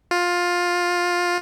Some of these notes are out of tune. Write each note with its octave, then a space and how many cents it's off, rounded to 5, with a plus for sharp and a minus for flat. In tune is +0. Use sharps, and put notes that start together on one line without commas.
F4 +15